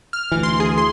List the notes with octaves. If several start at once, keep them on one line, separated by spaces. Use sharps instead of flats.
F6
D2 E3
C6
G#4
C6